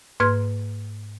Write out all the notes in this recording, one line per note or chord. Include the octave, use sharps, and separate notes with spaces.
G#2 A#3 B4 C6 F6 G#6